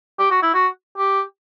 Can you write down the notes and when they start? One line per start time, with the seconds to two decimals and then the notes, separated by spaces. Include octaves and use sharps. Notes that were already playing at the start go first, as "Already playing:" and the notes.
0.19 G4
0.31 F#4
0.43 E4
0.54 F#4
0.98 G4